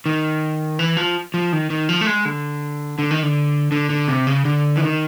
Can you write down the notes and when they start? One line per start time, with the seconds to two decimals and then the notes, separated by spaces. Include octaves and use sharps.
0.06 D#3
0.79 E3
0.97 F3
1.34 F3
1.53 D#3
1.70 D#3
1.89 F3
2.01 A3
2.07 G#3
2.25 D3
2.99 D3
3.11 D#3
3.23 D3
3.72 D3
3.90 D3
4.08 C3
4.27 C#3
4.45 D3
4.76 E3
4.81 D#3